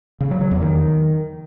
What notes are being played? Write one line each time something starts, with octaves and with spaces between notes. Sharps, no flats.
C#3
F#3
F#3
E2
D#3